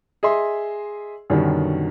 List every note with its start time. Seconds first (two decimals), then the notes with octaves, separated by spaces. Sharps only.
0.23 G#4 D#5 E5 C6
1.30 F#2 B2 D3 D#3 F#3 G3